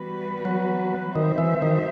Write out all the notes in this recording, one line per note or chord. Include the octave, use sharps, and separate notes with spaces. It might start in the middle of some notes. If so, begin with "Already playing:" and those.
Already playing: E3 G3 B3 F#4 B4
F#3
D#3 G3 C4 F#4 C5 E5
E3
D#3